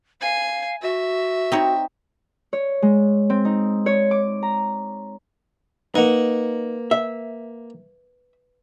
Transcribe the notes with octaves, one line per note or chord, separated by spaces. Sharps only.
F5 G#5
F#4 E5
C4 D#4 C#5
C#5
G#3
C4
D#4
C#5
D6
A#5
A#3 D#4 B4 F#5
E5